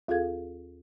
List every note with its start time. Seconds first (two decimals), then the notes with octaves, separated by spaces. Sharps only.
0.08 D#2 F4 G#4 A4 F5 G#6